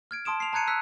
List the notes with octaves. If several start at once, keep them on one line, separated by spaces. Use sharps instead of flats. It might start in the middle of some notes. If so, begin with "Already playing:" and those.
F6 G#6 D7
A5 C6 D#6 D7 E7
C7 F7
A5 A#5 F#6 G#6 C#7 D#7
E6 F#6 B6 C#7